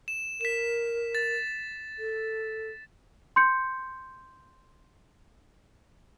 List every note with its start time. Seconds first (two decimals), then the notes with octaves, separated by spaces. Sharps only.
0.08 E7
0.41 A#4 B6 E7
1.15 A6
1.99 A4
3.36 C6 G6 C#7